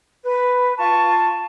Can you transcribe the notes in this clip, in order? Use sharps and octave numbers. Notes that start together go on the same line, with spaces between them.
B4
F4 A5 C#6